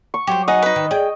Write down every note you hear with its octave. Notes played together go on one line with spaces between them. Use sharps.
C#6
F#3 G4 C5
D#4 G#4 D#5 F#5
D#4 B4
D#3
G#4 D5 G5